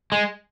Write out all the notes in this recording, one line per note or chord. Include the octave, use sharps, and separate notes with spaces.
G#3